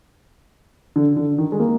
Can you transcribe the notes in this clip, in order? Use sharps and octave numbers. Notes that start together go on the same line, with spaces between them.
D3
D3
D#3
G#3
A#3